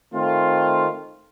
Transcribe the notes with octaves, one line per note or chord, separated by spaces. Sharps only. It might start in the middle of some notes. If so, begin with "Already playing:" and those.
D#3 A3 C4 F4